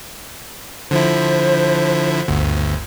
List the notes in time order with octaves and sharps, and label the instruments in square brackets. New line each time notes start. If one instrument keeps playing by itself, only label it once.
[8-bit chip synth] D3 F3 E4 [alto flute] C5
[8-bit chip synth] G1 D2